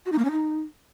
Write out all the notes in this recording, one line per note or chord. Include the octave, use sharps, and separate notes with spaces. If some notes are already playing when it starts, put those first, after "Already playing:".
F#4
D#4
A#3
C#4
D#4